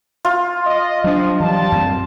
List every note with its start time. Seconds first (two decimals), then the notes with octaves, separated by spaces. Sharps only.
0.25 F4
0.66 D#5
1.04 F3 F#3 D4
1.40 E3 F#3 G3 A5
1.72 F#2 C4